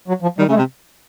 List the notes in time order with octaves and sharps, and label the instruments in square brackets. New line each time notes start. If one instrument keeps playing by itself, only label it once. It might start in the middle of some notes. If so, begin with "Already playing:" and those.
[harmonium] F#3
F3
[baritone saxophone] D#3 [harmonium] G3
[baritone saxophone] C#3 [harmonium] A3
[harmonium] G#3
[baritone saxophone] C3